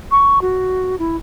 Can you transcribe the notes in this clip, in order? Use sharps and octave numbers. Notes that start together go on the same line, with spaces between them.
C#6
F#4
E4